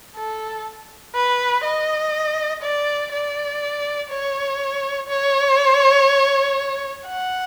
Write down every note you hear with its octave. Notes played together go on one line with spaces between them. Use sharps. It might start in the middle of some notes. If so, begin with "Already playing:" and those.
A4
B4
D#5
D5
D5
C#5
C#5
F#5